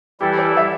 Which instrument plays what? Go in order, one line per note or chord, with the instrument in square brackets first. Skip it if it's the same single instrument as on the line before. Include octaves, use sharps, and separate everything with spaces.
[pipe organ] E3 G3 E4 A4 [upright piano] G4
[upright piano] D5
E5